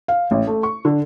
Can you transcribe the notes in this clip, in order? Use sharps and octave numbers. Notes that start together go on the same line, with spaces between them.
F5
A1
A3
C#6
D3